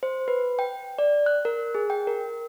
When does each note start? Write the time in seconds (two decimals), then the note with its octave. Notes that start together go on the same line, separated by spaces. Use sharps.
0.03 C5
0.28 B4
0.59 G5
0.99 D5
1.26 F#6
1.45 A#4
1.75 G#4
1.90 G5
2.07 A#4